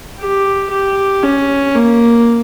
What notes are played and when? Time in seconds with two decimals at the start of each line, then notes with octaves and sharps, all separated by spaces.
0.20 G4
0.71 G4
1.23 C#4
1.75 A#3